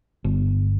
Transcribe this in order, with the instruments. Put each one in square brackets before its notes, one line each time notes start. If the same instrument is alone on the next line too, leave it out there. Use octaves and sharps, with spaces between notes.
[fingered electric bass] G1